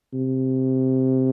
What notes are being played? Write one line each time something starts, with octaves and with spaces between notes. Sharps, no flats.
C3